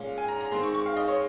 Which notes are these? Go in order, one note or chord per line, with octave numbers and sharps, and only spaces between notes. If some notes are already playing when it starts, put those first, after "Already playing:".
Already playing: A#2 G#3 C#4 F5
G#5
A#5
A#5
D#3 G#3 C4 C6
C#6
C#6
F5
D#5
C#5